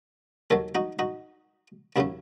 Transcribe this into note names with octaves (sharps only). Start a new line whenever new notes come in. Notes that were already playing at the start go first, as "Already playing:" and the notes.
D#2 D#3 F#3 A4 C#5
D#4 F#4
D#4 F#4
D#2 C#3 F#3 C#4 E4